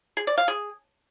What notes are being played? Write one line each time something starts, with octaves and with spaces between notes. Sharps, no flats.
G#4
D5
F5
G#4